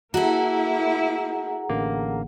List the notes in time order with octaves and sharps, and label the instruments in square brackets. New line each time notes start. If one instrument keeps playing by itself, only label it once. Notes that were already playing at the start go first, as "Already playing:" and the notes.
[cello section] A#3 E4 [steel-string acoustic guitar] F#4 A4 [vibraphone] G#4 F#5 A#5
[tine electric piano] A1 D3 A#3